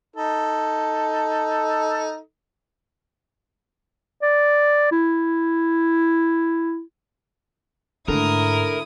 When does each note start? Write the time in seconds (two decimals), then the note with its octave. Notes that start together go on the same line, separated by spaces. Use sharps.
0.16 D#4 A4
4.22 D5
4.91 E4
8.08 G#2 D3 A3 E4 A#4 D#6